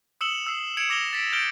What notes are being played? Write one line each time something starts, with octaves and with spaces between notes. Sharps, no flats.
D#6 E6 C#7 E7 F#7 G7
E6 C7
G#6 C#7 D7 E7 F7
D6 A#6 F7 G7
A6 B6 D7
F6 G6 A6 D7 F7 G7